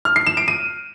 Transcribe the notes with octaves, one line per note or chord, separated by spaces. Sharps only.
F6
C7
E7
D7
D#7